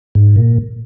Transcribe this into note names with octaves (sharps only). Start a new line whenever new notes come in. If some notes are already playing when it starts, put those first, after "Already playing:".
G#2
A#2